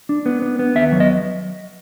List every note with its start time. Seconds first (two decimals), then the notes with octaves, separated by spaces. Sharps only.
0.09 D4
0.26 B3
0.42 B3
0.59 B3
0.75 D#2 E5
0.92 F#3
1.00 D#5